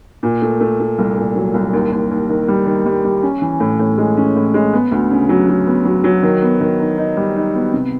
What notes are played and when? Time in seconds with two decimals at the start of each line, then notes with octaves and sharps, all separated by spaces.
0.23 A#2
0.42 A3
0.61 A3
0.80 A3
0.99 C2
1.17 A#2
1.36 F#3
1.54 C2
1.73 D#2
1.92 D#2
2.11 D#2
2.29 D#3
2.48 G3
2.66 D#3
2.86 G3
3.04 G3
3.23 C#4
3.42 E3
3.60 A2
3.79 A2
3.98 G#3
4.17 C#4
4.36 A2
4.54 G#3
4.73 B3
4.92 D2
5.10 C#3
5.29 F#3
5.48 F#3
5.67 B3
5.85 F#3
6.04 F#3
6.23 D#3
6.42 B3
6.61 D#3
6.80 D#4
6.98 D#4
7.17 G3
7.36 D#4
7.55 B3
7.73 C3